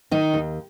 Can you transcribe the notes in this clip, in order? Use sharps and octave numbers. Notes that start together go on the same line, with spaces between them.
D#3 D#4
D#2